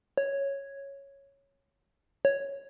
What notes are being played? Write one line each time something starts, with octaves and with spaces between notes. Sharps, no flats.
C#5
C#5